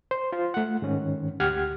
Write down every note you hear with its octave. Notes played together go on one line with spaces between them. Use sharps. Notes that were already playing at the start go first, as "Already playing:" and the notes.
C5
F4 C5
A3 F#5
G#2 D#3 C#4
D2 G4 F#5 F6 G#6